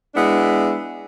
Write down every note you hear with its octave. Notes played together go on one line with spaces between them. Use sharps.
G#3 B3 D4 E4